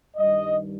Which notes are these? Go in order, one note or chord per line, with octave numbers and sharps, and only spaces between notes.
G2 D#3 G3 D#5